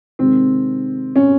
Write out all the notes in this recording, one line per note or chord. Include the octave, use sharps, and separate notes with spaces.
C3 D#3 G#3 C4
C#4